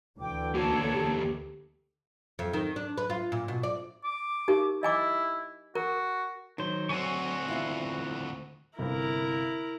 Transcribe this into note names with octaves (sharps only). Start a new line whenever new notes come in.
D2 D3 E3 G5 D6
E2 A#3 F#4 A4 C#5
G4
F2
D#3
D4
B4
F4
A#2
B2
D5
D6
D#4 G4 A#4
E4 D#5 G#5 D6
F#4 A#4
D#3 F#3 C5
D2 C4 F#4 G#5 C#6
E2 E4 F4
G1 C3 E4 A#4